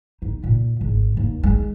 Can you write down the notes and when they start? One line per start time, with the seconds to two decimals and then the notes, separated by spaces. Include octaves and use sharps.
0.22 D#4
0.43 A#2
0.81 G#1
1.17 D#2
1.43 G#3